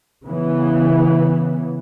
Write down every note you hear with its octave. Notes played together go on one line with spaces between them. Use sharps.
C#3 E3 B3